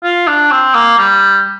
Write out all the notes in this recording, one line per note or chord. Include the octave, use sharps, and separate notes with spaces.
F4
D4
C4
A#3
G3